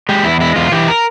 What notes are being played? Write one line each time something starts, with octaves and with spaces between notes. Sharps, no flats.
G#3 G4
E2 E4
G#3 E4
E2 F4
E3 G4
A#4